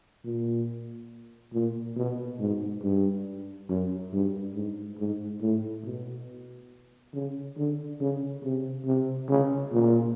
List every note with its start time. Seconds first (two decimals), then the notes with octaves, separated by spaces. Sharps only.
0.24 A#2
1.54 A#2
1.96 B2
2.39 G#2
2.83 G2
3.69 F#2
4.13 G2
4.55 G#2
4.98 G#2
5.42 A2
5.84 B2
7.14 C#3
7.58 D3
8.00 C#3
8.44 C3
8.86 C3
9.29 C#3
9.72 A#2